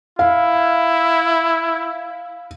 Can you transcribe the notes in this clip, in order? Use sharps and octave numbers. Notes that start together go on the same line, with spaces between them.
E4 F5